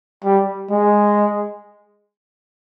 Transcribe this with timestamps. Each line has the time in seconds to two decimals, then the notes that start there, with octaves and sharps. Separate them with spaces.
0.25 G3
0.71 G#3